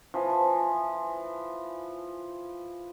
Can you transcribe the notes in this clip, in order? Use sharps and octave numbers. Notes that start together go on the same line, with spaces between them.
E3 F3